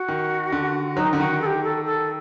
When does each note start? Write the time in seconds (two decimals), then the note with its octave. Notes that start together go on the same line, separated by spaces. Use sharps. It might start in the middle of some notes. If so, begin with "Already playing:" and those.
Already playing: F#4
0.08 D#3
0.52 D3
0.96 F#3 D#4
1.05 D#3
1.13 D3
1.19 D#3 F#4
1.41 A4
1.46 G4
1.63 A4
1.85 A4